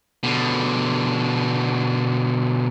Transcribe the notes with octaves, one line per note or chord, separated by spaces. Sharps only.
B2 D3